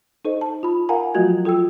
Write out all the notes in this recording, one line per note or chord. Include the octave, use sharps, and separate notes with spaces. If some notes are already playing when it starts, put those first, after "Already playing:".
D#4 A4 C5 D#5
A5
F4 B5
A#4 F5 F#5 G#5 A#5 B5
F3 F#3 A3 F4 F#4 G#6
F4 A4 G5 E6